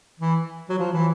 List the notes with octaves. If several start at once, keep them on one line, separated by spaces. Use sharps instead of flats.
E3
F#3
F3
E3